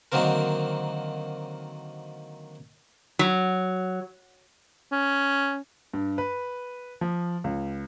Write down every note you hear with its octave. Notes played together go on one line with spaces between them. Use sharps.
D3 D#3 F#3 A#3 C4 A#4
F#3
C#4
G2
B4
F3
C#2